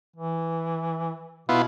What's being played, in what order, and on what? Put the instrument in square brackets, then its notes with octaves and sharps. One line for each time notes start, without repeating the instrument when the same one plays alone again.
[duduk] E3
[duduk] B2 [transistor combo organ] B3 E4 F4